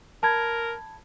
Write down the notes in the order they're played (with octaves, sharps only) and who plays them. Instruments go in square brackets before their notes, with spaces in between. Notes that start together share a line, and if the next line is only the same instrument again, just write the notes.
[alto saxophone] A#4 [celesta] A5 B5 G#6